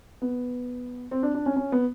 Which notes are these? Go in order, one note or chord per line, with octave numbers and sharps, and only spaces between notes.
B3
C4
D4
D4
C#4
C#4
B3